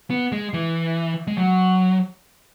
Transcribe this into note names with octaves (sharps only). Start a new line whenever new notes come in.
B3
G#3
E3
G#3
F#3